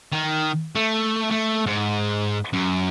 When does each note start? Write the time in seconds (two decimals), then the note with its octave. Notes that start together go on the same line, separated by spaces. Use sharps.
0.12 D#3
0.76 A3
1.31 A3
1.66 G#2
2.53 F#2